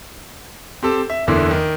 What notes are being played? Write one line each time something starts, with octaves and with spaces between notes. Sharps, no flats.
C4 G4 A4
E5
F#1 E2 D3 E4 C6 D6
D#3